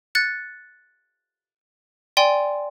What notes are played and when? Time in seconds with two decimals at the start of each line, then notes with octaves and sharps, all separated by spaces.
0.15 F#6 A6 C#7
2.17 D5 G5 G#5 C6